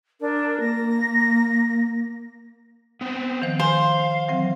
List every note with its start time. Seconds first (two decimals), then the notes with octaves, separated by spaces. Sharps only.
0.20 D4 A#4
0.60 A#3 A#6
3.01 B3 C4
3.42 D#3 F3 C5
3.60 C5 F5 G#5
4.28 E3 F#3 C4